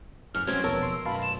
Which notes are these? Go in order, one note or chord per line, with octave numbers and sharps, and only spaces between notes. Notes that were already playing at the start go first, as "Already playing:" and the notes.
F#2 F6
C3 F#3 C4 C#4 G#6
E1 A#1 B3 A#4 C#5 A5 E6
C6
F#2 B2 F5 A5 B5 C6
E7